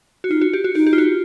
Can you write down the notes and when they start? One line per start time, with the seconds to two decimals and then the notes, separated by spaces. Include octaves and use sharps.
0.24 F#4
0.30 D#4 F4
0.41 F#4
0.53 G4
0.64 F#4
0.75 D#4 G4
0.87 G4
0.93 F4
0.98 F#4